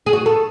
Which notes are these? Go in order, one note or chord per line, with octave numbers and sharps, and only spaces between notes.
G#4
F#4
A4